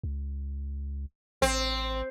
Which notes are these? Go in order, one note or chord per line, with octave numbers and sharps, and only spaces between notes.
C#2
A1 C4